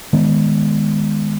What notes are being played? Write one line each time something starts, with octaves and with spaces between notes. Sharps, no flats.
D#3 G#3 B3